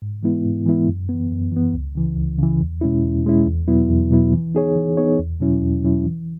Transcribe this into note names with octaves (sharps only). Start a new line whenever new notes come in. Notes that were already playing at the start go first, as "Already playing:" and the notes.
G#2
E3 G#3 B3 E4
G#2
E3 G#3 B3 E4
F#2
E3 B3
F#2
E3 B3
C#2
C#3 E3
C#2
C#3 E3
E2
B2 G#3 C#4 E4
E2
B2 G#3 C#4 E4
E2
B2 F#3 B3 E4
E2
B2 F#3 B3 E4
E3
B3 D#4 G#4 C#5
E3
B3 D#4 G#4 C#5
E2
B2 F#3 C#4 E4
E2
B2 F#3 C#4 E4
E3